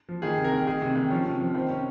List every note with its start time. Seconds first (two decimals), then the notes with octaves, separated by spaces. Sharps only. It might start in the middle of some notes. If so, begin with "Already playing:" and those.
0.09 F3
0.22 D#3 G#4
0.38 C3
0.44 A#4
0.52 D#3
0.67 D#3 G#4
0.82 C3
0.95 D#3
1.10 F3 C#4
1.25 C3
1.40 F3
1.54 D#3 C4
1.70 C3 C#4